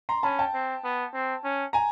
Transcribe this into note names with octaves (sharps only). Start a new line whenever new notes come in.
A#5 C6
C#4 A5 B5
G5 A5
C4
B3
C4
C#4
G#5 A#5